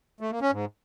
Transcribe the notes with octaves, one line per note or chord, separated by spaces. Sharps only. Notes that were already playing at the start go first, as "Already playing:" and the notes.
A3
A#3
C#4
G#2